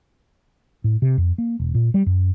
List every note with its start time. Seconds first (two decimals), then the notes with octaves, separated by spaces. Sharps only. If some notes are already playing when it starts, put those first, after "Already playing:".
0.84 A2
1.02 C3
1.18 F2
1.38 A#3
1.60 E1
1.75 A#2
1.94 G3
2.06 F#2